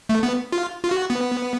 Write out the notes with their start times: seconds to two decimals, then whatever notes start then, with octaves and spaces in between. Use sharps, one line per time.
0.09 A3
0.23 B3
0.52 F4
0.84 F4
0.91 F#4
1.10 B3